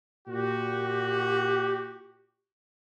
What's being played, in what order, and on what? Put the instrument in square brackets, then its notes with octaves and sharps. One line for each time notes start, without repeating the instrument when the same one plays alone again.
[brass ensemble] A#2 F#4 [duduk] G4